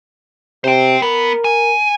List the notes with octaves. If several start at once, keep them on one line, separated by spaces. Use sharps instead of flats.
C3 C5 G5
B3 A#4
G#5